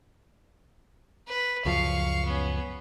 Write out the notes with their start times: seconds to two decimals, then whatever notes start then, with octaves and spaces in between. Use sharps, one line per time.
1.28 B4
1.65 C#2 F#2 F3 F5 C#6
2.26 B3 C#4